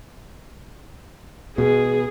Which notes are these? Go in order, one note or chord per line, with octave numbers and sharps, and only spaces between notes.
B2 G#4